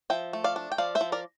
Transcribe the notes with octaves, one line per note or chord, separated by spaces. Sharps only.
F3 E5 G5
A3
D5 F5
D4
G5
F3 D5 F5
C5 E5
F3
A#4 D5